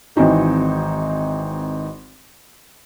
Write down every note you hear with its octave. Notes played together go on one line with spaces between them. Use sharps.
G#1 E3 C4 D#4 F#4